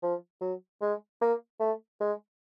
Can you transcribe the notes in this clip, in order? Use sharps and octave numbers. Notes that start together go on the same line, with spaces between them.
F3
F#3
G#3
A#3
A3
G#3